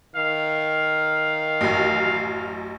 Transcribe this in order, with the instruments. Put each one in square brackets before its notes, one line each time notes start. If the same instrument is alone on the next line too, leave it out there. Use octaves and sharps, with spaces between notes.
[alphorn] D#3 [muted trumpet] F5
[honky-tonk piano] A1 F#2